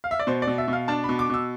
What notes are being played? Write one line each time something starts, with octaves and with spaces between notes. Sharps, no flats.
F5
E5
D5
B2 C5
D5
B2
E5
B2 F5
D4 A5
B2 B5
D6
B2 E6